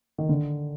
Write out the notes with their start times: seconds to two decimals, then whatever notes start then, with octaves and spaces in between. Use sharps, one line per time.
0.18 D#3
0.29 D3